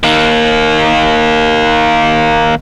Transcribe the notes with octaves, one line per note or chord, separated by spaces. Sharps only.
D#3 A#3